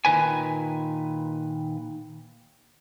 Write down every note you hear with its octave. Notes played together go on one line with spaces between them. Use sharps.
A#2 D#3 B4 G#5